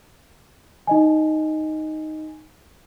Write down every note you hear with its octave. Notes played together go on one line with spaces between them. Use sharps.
D#4 D#5 G#5